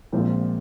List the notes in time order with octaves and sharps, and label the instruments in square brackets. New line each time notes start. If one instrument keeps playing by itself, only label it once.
[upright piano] A#1 A#2 G#3 C4 F4